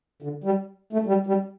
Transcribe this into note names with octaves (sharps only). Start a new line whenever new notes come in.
D3
G3
A3
G3
G3